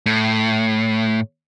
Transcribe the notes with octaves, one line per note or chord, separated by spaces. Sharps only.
A2